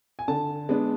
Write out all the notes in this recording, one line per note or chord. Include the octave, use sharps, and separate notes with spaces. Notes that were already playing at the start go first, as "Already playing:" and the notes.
G#5
D3 A5
G#3 B3 D4